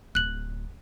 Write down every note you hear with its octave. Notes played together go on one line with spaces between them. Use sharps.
D1 F#6 F#7